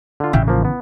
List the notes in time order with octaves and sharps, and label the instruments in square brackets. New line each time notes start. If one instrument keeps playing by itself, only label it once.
[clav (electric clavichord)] D3 F4
[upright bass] A1 [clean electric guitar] C#3 E3 [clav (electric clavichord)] E5 F5 G5
[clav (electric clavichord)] F3 A#3
B3